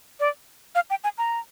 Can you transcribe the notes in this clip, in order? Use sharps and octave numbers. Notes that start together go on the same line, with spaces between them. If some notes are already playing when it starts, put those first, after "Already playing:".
D5
F5
G5
G#5
A#5